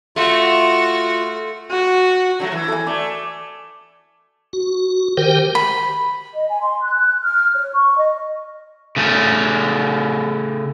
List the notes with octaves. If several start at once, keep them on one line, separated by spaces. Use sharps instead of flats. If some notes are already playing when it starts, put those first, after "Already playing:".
A3 F4 F#4
F#4
D3 F#3 A3
E3
A4 G#5
A3 D5
F#4
D#3 G4 A#4 C5 G5
B5
D#5
G#5
C6
F#6
F6
C#5
C#6
D#5
C#3 A3